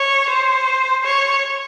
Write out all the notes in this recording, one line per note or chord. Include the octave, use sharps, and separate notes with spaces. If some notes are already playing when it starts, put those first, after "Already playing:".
Already playing: C#5
C5
C#5